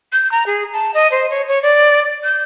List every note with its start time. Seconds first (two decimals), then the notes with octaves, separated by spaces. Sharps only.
0.13 G6
0.32 A#5
0.46 G#4
0.73 A5
0.94 D#5
1.11 C5
1.30 C#5
1.48 C#5
1.63 D5
2.24 G6